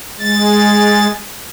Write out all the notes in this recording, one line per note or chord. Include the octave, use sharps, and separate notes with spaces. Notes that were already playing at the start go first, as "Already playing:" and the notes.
G#3 A6